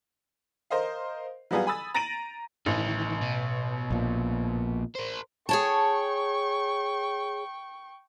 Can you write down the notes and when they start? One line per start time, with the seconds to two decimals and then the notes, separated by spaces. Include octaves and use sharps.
0.70 A#4 C5 D#5 F5
1.51 F#3 G3 B3 F4 G#4
1.67 G#5 B5 D#6 E6 A6
1.94 A#5 A6 A#6 D7 D#7 F#7
2.66 A1 D#3 E3
3.21 B2
3.90 A#1 A#2
4.95 A#4 C5
5.49 G#4 C#5 G5 A5 C#6